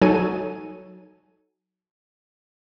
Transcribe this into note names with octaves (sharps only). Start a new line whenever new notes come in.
F#3 D#4 A4 G#5 D#7